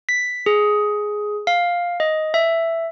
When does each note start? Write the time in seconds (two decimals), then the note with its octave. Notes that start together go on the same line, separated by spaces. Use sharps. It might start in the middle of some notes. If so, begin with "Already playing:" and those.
0.09 B6
0.46 G#4
1.47 F5
2.00 D#5
2.34 E5